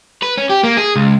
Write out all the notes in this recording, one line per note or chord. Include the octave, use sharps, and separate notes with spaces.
B4
C#4
G4
A#3
G#4
C#2